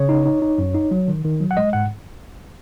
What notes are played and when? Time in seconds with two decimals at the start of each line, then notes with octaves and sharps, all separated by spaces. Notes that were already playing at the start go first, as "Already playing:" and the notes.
Already playing: C#3 C#5
0.09 D#4
0.26 D#4
0.42 D#4
0.58 F#2
0.74 D#4
0.91 F#3
1.08 D#3
1.24 D#3
1.40 F#3
1.51 F#5
1.57 G#3 D#5
1.73 G#2 F#5